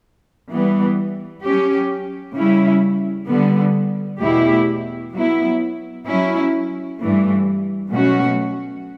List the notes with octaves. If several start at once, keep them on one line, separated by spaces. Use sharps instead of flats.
E3 G3 B3
F#3 C#4 G4
C#3 G3 C#4 E4
D3 G3 B3
E2 B2 A3 E4 G4
F#3 B3 E4
F#3 C#4 E4
G2 E3 A3
B2 F#3 A3 C#4 F#4